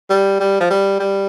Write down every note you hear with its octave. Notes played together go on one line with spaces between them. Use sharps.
G3
G3
F3
G3
G3